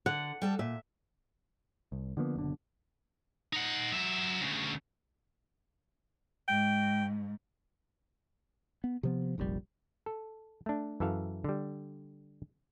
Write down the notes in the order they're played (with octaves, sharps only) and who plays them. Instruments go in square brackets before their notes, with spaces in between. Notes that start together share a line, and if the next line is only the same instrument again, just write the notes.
[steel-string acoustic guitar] D3 [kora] F#5
[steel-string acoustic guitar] G3 A4 A5
[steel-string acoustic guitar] A#2 [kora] E5
[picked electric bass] C2
D3 F3 A#3 B3
F#1 B2 D3
[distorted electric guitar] D#4 F#5
F#3 E5
D2 C#3
[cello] G#2 [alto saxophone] G5
[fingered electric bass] B3
C3 F3 B3
F1 A#1 A#2 G3
[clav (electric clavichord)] A4
A3 D4
F#2 E3 A4 E5 F5
D3 G3